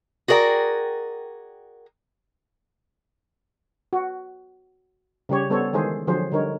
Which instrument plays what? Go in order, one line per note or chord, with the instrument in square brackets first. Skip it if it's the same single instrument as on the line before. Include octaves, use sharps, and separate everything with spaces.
[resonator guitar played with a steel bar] F#4 G#4 A#4 D5 G5
[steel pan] F#4
C#3 G3 G4 C#5
G3 B3 A4 C5 C#5
D#3 E3 G#3 G#4 A4 C5
D3 F3 F#3 G#4 C5
D3 G3 D#4 A#4 C#5